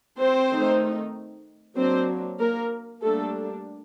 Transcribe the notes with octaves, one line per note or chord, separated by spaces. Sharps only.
C4 C5
D#3 A3 D#4
F#3 A#3 C4 D4 C5
A#3 A#4
G3 A3 A#3 D4 A4